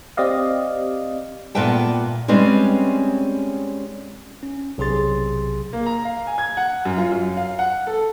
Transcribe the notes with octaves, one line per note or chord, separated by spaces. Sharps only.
C4 G4 D5 D#5 F5
A#2 B3 B4 E5 G5 A5
G3 G#3 C4 C#4 B4
C#4
B1 C3 G#4 C6 A6
A#3
A#5
F5
G#5
G#6
F#5
F#2
F4
F#2
F5
F#5
A4